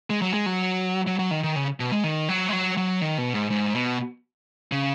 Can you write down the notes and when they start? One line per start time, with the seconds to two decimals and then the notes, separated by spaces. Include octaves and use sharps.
0.10 G#3
0.22 F#3
0.34 G#3
0.46 F#3
1.07 F#3
1.19 F#3
1.31 D#3
1.44 D#3
1.56 C#3
1.80 B2
1.92 G#3
2.04 D#3
2.29 F#3
2.49 G#3
2.53 F#3
2.77 F#3
3.01 D#3
3.18 B2
3.34 G#2
3.51 G#2
3.75 B2
4.72 C#3